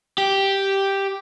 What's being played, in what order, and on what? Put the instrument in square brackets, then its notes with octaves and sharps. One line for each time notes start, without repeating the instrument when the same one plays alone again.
[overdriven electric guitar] G4